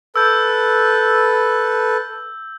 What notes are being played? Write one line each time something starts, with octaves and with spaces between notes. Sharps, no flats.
A4 B4 E6 G6